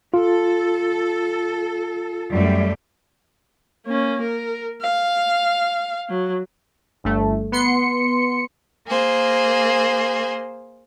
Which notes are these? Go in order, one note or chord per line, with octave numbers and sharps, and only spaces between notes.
F4 A4
F#2 G3 A3
A#3 C#4
A#4
F5
F#3
G1 A3
B3 C6 C#7
A#3 G#4 C5